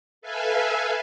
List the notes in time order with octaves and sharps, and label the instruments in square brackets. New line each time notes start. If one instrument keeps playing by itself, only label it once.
[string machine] A4 B4 E5 F5 G#5